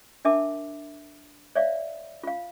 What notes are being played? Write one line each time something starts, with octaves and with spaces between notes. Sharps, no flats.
D4 A#4 E5 A5 D6
C#5 D5 E5 F5
F4 F5